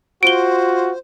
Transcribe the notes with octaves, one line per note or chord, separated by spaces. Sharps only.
F4 F#4 C5 D7 G7